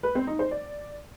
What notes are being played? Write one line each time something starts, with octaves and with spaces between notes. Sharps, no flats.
B4
C4
D#4
C5
D5